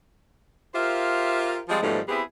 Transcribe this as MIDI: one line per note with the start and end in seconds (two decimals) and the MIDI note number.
0.74 1.60 65
0.74 1.60 67
0.74 1.60 70
0.74 1.60 72
0.74 1.60 76
0.74 1.60 77
1.68 1.81 53
1.68 1.81 55
1.68 1.81 56
1.68 1.81 60
1.68 1.81 65
1.83 2.00 44
1.83 2.00 47
1.83 2.00 51
1.83 2.00 53
1.83 2.00 55
1.83 2.00 57
2.08 2.22 59
2.08 2.22 60
2.08 2.22 64
2.08 2.22 67
2.08 2.22 68